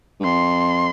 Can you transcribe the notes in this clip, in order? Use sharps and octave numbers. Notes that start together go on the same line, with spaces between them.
G2
F2 C6